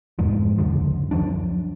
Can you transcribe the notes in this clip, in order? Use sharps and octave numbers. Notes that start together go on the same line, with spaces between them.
F1 E2 G#2 F3
C#2 F#2 D3 F3
F#2 F3 F#3 D4